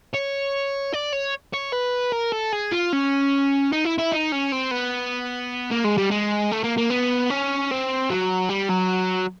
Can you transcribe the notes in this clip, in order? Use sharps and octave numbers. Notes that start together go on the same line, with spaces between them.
C#5
D5
C#5
C#5
B4
A#4
A4
G#4
F4
C#4
D#4
E4
E4
D#4
C#4
C4
B3
A#3
G#3
G3
G#3
A3
A#3
A#3
B3
C#4
C4
F#3
G3
F#3